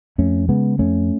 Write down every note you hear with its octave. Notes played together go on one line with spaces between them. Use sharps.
F2 A3 C#4
C#3 G#3 B3
F2 A3 C#4